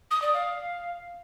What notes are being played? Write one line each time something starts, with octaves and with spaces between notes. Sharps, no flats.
D#6
D5
F5